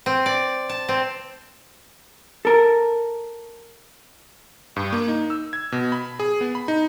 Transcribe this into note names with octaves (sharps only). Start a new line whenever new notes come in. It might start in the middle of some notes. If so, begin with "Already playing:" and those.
C4
D5
A5
C4
A4 A#4
G2
A#3
D#4
E6
G#6
B2
B5
G#4
B3
B5
D#4